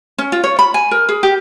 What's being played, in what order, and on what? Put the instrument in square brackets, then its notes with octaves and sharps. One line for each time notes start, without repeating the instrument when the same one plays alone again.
[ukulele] C#4
F4
C#5
B5
G#5
A#4
G#4
G4